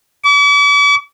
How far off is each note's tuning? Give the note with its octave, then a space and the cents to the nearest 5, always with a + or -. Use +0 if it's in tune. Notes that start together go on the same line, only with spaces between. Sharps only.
D6 -45